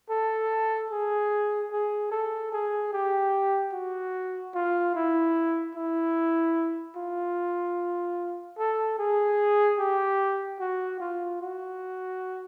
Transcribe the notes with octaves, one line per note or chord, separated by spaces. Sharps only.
A4
G#4
G#4
A4
G#4
G4
F#4
F4
E4
E4
F4
A4
G#4
G4
F#4
F4
F#4